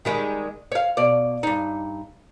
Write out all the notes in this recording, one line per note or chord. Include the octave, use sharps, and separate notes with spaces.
D#3 G3 G#3
C#5 F5
B2 C#5 D5
G2 D#4